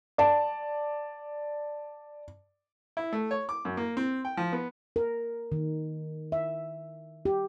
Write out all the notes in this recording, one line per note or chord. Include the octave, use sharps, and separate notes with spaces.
D5 A5
E4
A3
C#5
D6
F#2
A#3
C4
G5
F3
B3
A#4
D#3
E5
G4